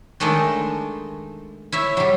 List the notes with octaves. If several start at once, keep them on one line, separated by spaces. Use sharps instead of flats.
D#3 G#3 A3 D4 D#4
E4 C#5 E5
F#3 G3